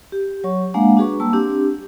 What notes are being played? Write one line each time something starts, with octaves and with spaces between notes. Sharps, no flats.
G4
F#3 C#5 C#6
G#3 A#3 D4 F5 F#5
D4 F#4 G#4 B4 C#6
G3 A#3 A5 E6
C4 D4 G4